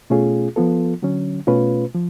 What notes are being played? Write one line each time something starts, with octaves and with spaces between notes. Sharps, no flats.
B2 A3 C#4 F4 G#4
F3 B3 F4 A4
D3 F#3 C#4
B2 A3 C#4 F4 B4
F3